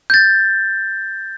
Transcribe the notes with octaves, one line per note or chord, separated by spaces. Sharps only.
G6 A6